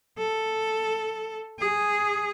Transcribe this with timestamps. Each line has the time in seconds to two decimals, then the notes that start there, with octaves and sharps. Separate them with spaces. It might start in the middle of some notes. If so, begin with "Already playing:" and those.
0.18 A4
1.59 G#4